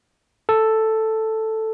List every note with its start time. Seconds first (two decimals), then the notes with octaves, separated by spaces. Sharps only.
0.49 A4